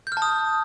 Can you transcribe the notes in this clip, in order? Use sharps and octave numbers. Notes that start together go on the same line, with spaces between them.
G6
F6
A5
D#6